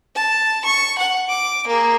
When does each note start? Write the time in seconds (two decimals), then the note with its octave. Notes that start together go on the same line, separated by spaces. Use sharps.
0.15 A5
0.65 C#6
0.98 F#5
1.29 D6
1.67 A#3 G#4